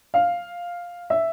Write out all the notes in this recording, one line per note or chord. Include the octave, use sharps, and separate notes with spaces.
F5
E5